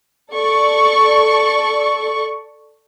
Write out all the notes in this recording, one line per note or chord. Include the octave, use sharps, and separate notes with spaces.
A4 D5 C#6